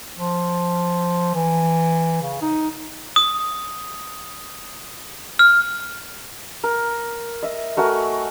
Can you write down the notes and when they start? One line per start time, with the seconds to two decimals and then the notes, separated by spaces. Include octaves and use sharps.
0.16 F3
1.34 E3
2.22 C#3
2.41 D#4
3.16 D#6
5.39 F6
6.64 A#4
7.43 D#5 E5
7.77 A3 F#4 A#4 G#5